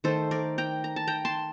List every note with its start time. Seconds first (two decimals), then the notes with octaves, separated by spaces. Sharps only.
0.04 D#3 A3 A4 C5
0.31 A#4 D5
0.58 G5 A#5
0.84 A#5
0.96 A5
1.07 G5 A#5
1.25 A5 C6